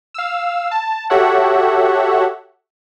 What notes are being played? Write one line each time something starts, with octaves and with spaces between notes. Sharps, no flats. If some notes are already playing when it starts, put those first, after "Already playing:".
F5 E6
A5
F#4 G4 A4 C#5 E5 F#5